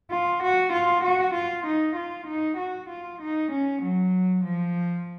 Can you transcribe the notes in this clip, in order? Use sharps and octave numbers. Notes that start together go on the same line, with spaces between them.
F4
F#4
F4
F#4
F4
D#4
F4
D#4
F#4
F4
D#4
C#4
F#3
F3